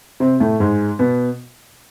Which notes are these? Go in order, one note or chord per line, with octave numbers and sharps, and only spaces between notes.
C3 C4
A2 A3
G#2 G#3
B2 B3